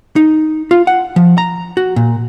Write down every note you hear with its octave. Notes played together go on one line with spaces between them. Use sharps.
D#4
F4
F#5
F3
A#5
F#4
A#2